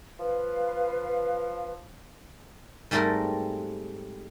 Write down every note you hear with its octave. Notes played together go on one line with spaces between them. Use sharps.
F3 B4 F5
G#2 G3 A3 C4 A4 A#4